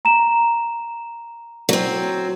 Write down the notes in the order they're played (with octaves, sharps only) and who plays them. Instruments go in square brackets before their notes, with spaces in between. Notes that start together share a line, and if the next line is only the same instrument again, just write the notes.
[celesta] A#5 E7
[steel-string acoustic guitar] F#3 C4